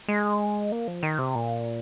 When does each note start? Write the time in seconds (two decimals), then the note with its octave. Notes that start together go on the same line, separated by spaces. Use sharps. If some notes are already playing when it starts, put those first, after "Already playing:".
0.08 G#3
0.72 A#3
0.88 F3
1.03 D#3
1.18 C3
1.35 A#2